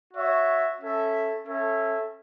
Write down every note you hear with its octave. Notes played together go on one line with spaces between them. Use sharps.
F#4 C#5 E5
C#4 A4 E5
C#4 A4 E5